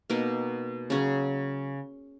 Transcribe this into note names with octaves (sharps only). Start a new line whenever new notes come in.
B2 A#3 D#4 A#4
C#3 F#3 C#4 G#4